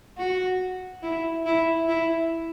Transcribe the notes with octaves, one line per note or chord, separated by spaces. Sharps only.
F#4
E4
E4
E4